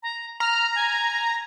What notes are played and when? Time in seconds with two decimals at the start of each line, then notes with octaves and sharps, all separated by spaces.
0.03 A#5
0.40 A#5 F6
0.75 G#5